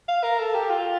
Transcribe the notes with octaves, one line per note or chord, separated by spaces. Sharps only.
F5
A#4
A4
G4
F4